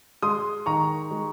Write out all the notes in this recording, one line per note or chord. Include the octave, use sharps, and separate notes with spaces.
G#3 C6 D#6
D#3 A#5 C#6
G#3